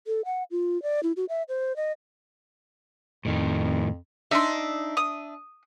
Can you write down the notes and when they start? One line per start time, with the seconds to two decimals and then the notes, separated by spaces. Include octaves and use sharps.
0.07 A4
0.25 F#5
0.51 F4
0.83 D5
1.03 E4
1.17 F#4
1.29 E5
1.49 C5
1.76 D#5
3.25 F2 A2 D#3
4.31 D4 D#4 E5 C6
4.97 D#6